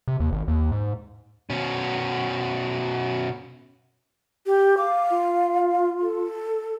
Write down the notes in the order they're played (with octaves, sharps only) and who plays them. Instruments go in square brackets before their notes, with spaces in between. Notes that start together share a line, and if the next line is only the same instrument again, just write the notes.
[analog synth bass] C3
D#2
G#1
D#2
G#2
[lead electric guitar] B2 C#4
[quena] G4
[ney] F5 [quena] D6
[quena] F4
[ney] A4